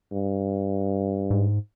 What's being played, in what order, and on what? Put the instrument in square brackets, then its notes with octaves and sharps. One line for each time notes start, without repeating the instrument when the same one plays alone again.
[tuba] G2
[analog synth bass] G#2